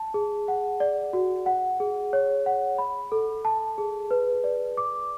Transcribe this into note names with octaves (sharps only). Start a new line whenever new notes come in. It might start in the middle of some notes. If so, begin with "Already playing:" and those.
Already playing: A5
G#4
F#5
D5
F#4
F#5
G#4
C#5
F#5
B5
A4
A5
G#4
B4
D5
D6